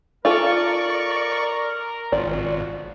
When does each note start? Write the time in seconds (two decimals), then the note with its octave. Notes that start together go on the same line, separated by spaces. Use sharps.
0.25 F4 A4 A#4 D5 C#6
2.12 G#1 C#4 F4 F#4 D5